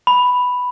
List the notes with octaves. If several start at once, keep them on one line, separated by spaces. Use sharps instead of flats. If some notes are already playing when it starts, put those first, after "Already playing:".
B5